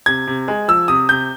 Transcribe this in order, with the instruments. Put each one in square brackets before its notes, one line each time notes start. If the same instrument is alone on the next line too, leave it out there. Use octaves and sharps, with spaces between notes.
[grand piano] C3 G#6
C3
G#3
F3 E6
C3 D#6
C3 G6